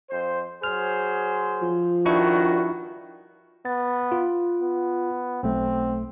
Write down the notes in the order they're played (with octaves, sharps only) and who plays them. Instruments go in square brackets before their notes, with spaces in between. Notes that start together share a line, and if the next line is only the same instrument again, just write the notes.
[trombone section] F2 C5
[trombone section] F#3 G#4 C5 [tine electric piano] F6
[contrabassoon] F3
[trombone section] G2 D#3 F#4 [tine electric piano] D4 E4 C#6
[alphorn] B3 [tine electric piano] A6
[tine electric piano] F4
[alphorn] B3
[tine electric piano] B1 A3 [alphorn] C4